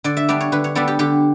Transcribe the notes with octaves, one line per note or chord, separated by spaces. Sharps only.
D3 D5
E5
G3 B3 D4 D5
C#5
D3 B4
C#5
G3 B3 D4 A4
G4
D3 G4